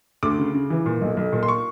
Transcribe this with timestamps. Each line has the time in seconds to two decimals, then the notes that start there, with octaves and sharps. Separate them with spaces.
0.23 D2 D6
0.39 C#3
0.54 C#3
0.70 E3
0.86 A#2
1.01 B1
1.17 B1
1.33 A#2
1.43 C6
1.48 C#6